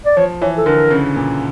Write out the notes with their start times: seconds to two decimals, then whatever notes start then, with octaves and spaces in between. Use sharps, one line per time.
0.05 D5
0.17 F3 C#5
0.42 E3 C#5
0.57 A4
0.66 D3 A#4
0.91 C#3
1.16 A#2